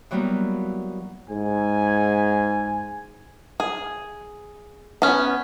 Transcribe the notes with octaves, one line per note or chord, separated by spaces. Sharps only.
E3 F#3 G3 A#3 B3
G#2 G#5
G#4
B3 C#4